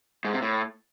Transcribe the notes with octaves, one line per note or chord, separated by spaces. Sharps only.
G#2
C3
A2